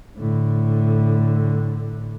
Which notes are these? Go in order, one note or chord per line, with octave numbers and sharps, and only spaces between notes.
A2 D3